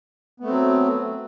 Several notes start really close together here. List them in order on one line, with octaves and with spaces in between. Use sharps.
B3 A3 C4 F#3